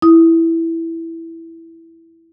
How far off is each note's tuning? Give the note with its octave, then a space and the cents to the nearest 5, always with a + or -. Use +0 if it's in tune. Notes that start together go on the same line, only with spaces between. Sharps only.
E4 +0 D#6 +0